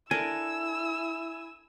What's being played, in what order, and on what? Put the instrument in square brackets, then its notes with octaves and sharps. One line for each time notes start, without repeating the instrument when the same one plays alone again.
[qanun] D4 A4 A#4 [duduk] E4 [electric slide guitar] G#5 [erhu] E6